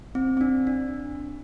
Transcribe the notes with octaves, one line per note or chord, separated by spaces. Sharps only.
C4
C4
D4
D4